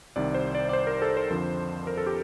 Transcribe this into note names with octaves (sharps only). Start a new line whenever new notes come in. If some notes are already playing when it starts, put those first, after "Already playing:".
C2 C3 D#3 D5
C5
D5
D5
C5
A#4
A4
C5
F2 D3 F3
A#4
A4
G4